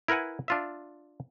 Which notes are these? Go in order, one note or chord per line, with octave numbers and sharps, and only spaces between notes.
E4 A#4 B4 F#5 G#5
D4 F4 E5